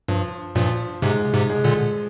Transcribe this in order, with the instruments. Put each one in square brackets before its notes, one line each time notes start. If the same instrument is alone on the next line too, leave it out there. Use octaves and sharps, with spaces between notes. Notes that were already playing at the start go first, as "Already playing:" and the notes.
[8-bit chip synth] G2 [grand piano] F3
[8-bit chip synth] G2 A#2 [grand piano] F3
[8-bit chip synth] G#2 C3 [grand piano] G#3
[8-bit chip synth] G#2 C3
[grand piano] G#3
[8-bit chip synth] A#2 D3